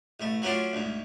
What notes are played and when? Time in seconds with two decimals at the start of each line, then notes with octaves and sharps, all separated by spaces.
0.20 A1 A3
0.42 F#3 A3 C#4 D4 F4
0.73 D2 G#2